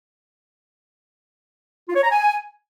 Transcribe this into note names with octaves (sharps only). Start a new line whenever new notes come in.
F4
C#5
A#5
G#5